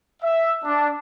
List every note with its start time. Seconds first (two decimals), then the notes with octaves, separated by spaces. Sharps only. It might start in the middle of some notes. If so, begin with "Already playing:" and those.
0.23 E5
0.65 D4